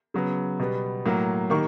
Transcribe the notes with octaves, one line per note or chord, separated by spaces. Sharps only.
C#3 F#3 B3
B2 G3 B3
A2 F#3 A#3
D#3 G3 A#3 C#6